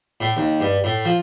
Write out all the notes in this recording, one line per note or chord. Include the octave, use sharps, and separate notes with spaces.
A2
D#2
G2
A2
F3